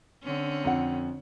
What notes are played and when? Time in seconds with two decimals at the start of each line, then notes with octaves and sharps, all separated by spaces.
0.23 D3 C4 C#4
0.64 F2 F#5